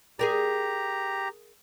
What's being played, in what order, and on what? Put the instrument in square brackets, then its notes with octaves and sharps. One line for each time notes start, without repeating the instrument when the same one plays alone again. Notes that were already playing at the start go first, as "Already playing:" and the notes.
[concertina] G4 A#5 [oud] G#4 A#4 D5